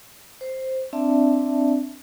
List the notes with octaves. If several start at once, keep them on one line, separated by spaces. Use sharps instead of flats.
C5
C4 D4 D5 E5 A5